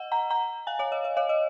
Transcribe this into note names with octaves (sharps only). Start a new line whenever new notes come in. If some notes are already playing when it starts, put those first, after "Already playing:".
Already playing: D#5 F#5
F#5 A#5
F#5 A#5
F5 G#5
C#5 F5
D#5
D#5
C#5 F5
D#5